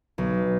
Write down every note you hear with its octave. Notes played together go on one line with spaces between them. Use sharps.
B1